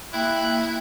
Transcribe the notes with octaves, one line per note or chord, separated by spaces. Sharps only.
A#3 E4 G5 F#6